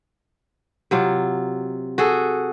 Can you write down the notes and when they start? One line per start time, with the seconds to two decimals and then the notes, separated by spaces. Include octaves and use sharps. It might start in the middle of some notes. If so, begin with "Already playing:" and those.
0.91 C3 F#3 F4
1.98 F#4 G#4 A4